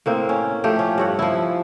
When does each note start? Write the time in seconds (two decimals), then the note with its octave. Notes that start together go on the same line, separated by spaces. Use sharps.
0.06 A2 A#3 C4
0.29 C#4
0.64 F3 A3 G4
0.79 C#4
0.98 G2 C#5 F#5
1.19 F3 E4